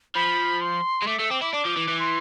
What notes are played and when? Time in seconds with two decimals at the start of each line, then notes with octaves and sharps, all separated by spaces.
0.15 F3 B5
0.61 C6
1.02 G#3
1.07 A3 D6
1.19 A3 E6
1.30 C4 D6
1.41 E4 D6
1.53 D4 D6
1.65 F3
1.76 E3
1.88 E3
1.99 C6